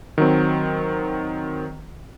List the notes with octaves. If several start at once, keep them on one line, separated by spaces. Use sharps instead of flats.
D#3 F#3 C4